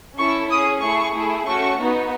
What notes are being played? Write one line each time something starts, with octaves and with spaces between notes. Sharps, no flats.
C#4 E4 A4 C#6
C#4 G#4 D#6
A3 E4 G#4 C#6
A3 E4 G#4
A3 C#4 F#4 C#6
B3 D#4 F#4